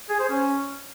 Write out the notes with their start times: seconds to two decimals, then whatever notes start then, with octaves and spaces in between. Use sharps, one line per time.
0.10 G#4
0.19 C5
0.29 C#4